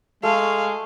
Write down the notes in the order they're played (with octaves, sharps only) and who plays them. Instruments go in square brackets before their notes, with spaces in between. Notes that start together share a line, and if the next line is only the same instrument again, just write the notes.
[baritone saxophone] G#3 [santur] A3 [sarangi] F5